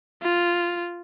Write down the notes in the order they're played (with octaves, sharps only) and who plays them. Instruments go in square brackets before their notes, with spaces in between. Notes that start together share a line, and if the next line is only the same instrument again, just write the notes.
[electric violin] F4